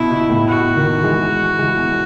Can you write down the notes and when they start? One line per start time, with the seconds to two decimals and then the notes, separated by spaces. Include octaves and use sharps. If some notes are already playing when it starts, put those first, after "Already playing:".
Already playing: B2 E4
0.11 B2
0.30 A2
0.48 B2 F#4
0.76 B2 D#3
1.03 E3 G#3
1.59 E3 G#3
1.77 B2